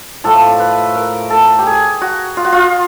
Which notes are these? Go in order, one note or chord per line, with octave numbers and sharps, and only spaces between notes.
A2 F3 A3 A4
B4
A#4
A4
G4
G#4
F#4
F4
F#4
F4